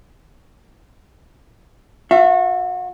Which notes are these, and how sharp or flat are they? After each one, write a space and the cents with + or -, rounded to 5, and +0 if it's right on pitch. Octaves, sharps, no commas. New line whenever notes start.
F#4 -35 E5 +25